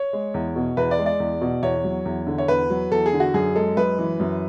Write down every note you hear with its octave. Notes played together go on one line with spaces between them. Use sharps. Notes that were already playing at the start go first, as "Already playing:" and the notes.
Already playing: C#5
G#3
E2
B2
E2 B4
D5
G#3
D5
E2
B2
E2 C#5
F#3
E2
D3
C#5
E2 B4
F#3
E2 A4
G#4
D3
F#4
F#2 G#4
G#3 A4
F#2 B4
E3
F#2